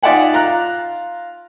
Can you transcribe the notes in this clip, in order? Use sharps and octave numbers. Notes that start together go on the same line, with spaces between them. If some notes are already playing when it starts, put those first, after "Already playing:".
D#4 F4 D5 E5 F#5 G#5
F4 A#5 F#6